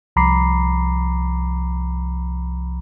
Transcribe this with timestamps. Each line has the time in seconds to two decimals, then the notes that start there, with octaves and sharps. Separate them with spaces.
0.16 C2 F3 A#5 B5 D6 C7